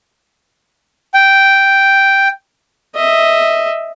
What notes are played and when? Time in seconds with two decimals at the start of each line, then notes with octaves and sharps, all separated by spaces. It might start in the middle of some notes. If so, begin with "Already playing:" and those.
1.14 G5
2.96 D#5 E5